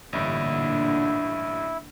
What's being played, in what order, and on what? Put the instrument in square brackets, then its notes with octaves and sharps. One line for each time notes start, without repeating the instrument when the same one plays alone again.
[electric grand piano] A1 G2 [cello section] A#2 D3 [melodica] E4